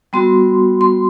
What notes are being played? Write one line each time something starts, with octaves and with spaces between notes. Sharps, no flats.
G3 B3 F#4 C6
C6